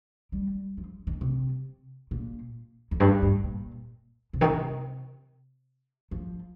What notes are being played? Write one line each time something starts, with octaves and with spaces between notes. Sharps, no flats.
G3
F3
D#3
C3
A#2
F2
G2
G2
A#2
C3
D#3
C3
F3